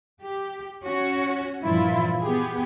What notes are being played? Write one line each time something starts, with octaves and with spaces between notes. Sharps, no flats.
G4
C#4 F#4
G2 A#2 E3 F3 E4 F4
B3 G4 G#4